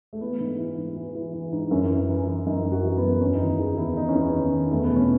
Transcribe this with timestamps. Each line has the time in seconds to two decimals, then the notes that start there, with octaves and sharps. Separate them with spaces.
0.13 A3
0.21 E3 B3
0.40 G#2
0.59 E3
0.78 G#2
0.96 E3
1.15 E3
1.34 E3
1.52 G#2
1.71 F#2 C#4
1.90 E3
2.09 E3
2.27 E3
2.46 F#2 D#4
2.65 F#2
2.72 F#4
2.84 E3
2.97 B3
3.03 F#2
3.21 E2 C#4
3.35 D#4
3.40 D#3 E4
3.59 D#3 G#4
3.77 E2 E4
3.96 E2 D#4
4.08 C#4
4.14 E2
4.20 B3
4.33 D#3 C#4
4.52 D#3
4.71 E2 A3
4.84 B3
4.90 B2
4.96 C#4